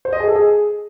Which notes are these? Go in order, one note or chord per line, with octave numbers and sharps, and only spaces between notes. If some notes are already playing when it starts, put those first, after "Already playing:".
C5
D#5
G#4
A4
G#4